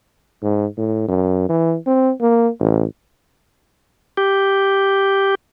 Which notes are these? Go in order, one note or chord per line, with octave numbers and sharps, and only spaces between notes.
G#2
A2
F#2
E3
C4
A#3
A1
G4